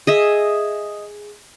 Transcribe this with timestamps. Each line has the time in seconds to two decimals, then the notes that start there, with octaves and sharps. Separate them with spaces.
0.07 G#4 D#5 E5